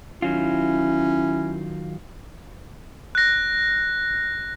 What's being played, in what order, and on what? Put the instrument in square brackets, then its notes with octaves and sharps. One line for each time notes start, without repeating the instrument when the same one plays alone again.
[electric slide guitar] D#3 F#3 F4 [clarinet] C#4 [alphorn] E4
[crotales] F#6 A#6